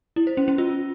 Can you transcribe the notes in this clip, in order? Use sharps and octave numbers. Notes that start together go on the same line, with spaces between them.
E4
C5
C#4
C#4
F4